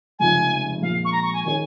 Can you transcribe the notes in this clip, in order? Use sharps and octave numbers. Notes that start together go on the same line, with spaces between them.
F1 F2 C#3 F3 G#3 G#5
A#1 A#2 G#3 F5
C#6
A#5
C#6
G#5
D#3 C#4 G#4 C#5 G#5